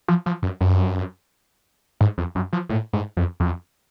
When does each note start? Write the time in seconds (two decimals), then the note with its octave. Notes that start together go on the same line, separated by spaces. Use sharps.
0.08 F3
0.26 F3
0.43 F#2
0.61 F#2
2.01 G#2
2.18 F2
2.35 F#2
2.53 F3
2.69 A2
2.93 G#2
3.17 F2
3.40 F2